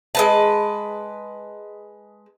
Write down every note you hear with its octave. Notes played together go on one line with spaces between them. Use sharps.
G#3 B4 A5